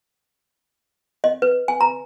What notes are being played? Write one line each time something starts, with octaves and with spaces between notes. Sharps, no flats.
D#5
B4
G#5
A#5